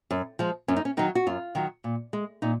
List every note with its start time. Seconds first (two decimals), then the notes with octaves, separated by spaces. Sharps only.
0.11 F#2
0.39 F3 G#3
0.68 F#2 C#4
0.76 D#4
0.85 C#4
0.97 D#3 F#3 D#4
1.15 F#4
1.26 F#2 F4
1.55 D#3 F#3
1.84 A#2
2.13 G#3
2.42 A#2 D#4